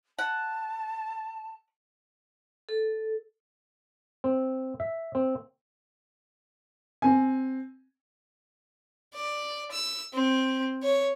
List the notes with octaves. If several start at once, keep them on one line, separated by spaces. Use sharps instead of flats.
F#5 A5
A4
C4
E5
C4
C4 G#5
D5
E6
C4
C#5